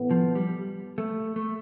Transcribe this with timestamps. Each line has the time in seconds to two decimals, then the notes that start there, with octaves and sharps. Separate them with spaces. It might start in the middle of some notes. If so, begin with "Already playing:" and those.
Already playing: A2 E3 B3
0.11 F3
0.35 G3
0.98 A3
1.36 A3